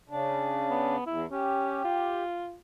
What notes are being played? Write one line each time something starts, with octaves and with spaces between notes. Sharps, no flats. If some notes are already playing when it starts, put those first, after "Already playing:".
C#3 D4
B3
E2 E4
C#4 G4
F4